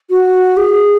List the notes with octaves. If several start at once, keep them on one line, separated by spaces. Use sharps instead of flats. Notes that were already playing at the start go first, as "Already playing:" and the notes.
F#4
G#4